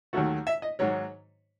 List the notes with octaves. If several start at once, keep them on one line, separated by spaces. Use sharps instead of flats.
D#2 D#3 F#3 A3 F#4
E5
D#5
G#2 D#3 F#3 C#5